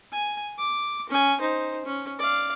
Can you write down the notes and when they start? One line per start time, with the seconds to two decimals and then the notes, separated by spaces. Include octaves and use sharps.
0.12 G#5
0.58 D6
1.10 C#4 G#5
1.41 D#4 C5
1.85 C#4
2.19 D5 F5